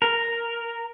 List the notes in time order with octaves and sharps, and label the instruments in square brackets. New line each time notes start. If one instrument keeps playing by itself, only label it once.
[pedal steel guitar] A#4